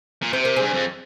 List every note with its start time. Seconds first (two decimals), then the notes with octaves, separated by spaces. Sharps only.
0.22 A#2
0.33 C3 C5
0.45 A#4
0.56 G2 G#4 C5
0.73 F2